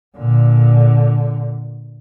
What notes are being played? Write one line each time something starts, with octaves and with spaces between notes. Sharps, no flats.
A#2 D3